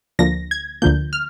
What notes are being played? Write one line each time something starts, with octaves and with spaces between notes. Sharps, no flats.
D2 D3 F3 A#3 A#6
G#6
D2 D3 F3 A#3 G6
F6